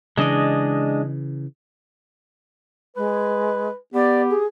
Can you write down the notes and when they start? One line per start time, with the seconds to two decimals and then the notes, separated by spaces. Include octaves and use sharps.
0.17 C#3 E3 G#3 D4 D#5
2.96 G#3 B4
3.94 B3 G4 D5
4.29 G#4